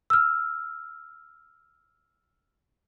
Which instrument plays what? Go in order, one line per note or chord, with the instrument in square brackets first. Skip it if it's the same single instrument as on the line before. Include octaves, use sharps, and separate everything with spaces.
[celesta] E6 F6